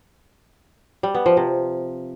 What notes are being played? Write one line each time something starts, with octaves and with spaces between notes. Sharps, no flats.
G3
B3
F3
C3